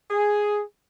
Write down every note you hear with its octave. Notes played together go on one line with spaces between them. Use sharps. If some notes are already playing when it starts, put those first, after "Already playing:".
G#4